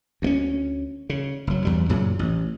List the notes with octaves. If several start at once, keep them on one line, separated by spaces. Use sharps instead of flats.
D2 A3 C#4
C#3
F#1 F#3
E2 G3
F#2 A#2 C#3 F#3
A1